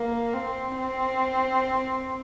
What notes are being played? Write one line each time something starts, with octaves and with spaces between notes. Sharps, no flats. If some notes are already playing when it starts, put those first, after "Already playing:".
Already playing: A#3
C4
C4